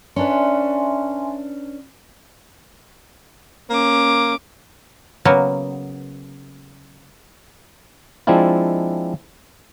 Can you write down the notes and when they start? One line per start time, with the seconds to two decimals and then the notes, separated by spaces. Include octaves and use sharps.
0.16 C#4 D4 B4 E5 G#5 C6
3.70 A#3 C#4 D6
5.25 C#3 F#3 A#3 B3
8.27 F3 G#3 C4 D4 E4 F4